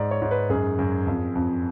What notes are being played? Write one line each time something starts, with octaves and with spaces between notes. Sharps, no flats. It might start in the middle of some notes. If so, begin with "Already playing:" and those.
Already playing: G#2 D5
C#5
G#2
B4
F#2 G#4
F#2
F2
F2